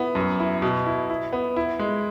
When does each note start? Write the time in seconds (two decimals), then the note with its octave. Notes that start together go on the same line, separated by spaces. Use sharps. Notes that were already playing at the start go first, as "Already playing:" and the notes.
Already playing: B3 E4
0.15 F#2
0.40 E4
0.62 B2
0.86 E4
1.10 E4
1.32 B3
1.56 E4
1.79 G#3